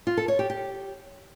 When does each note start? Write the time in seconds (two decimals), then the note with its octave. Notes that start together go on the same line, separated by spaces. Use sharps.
0.07 F4
0.17 A4
0.28 C#5
0.39 G4
0.50 G4